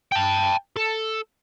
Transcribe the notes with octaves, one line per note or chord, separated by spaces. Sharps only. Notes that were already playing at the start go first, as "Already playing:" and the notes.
G5 A5
A4